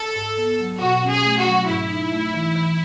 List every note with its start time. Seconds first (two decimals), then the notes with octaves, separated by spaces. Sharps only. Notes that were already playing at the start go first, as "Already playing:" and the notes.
Already playing: A4
0.16 G#2
0.37 B3
0.60 F#3
0.81 B2 F#4
1.03 C#4
1.11 G#4
1.25 A3
1.39 F#4
1.47 F#3
1.68 G#2 E4
1.90 D#4
2.12 A3
2.34 E3
2.56 E3